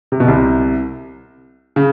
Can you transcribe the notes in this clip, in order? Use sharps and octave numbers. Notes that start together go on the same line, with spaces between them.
C3
B2
C2 C3
C#3